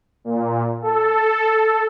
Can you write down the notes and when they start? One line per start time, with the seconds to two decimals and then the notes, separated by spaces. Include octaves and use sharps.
0.25 A#2
0.82 A4